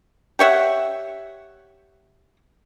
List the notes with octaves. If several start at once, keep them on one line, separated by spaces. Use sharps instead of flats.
G4 C#5 E5 F#5